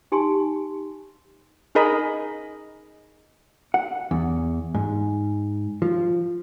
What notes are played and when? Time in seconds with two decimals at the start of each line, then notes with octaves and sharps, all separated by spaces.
0.12 D#4 G4 G#5 C6
1.75 D#4 G#4 A#4 D#5 B5
3.74 F#5
4.11 E2
4.74 G#2
5.82 F3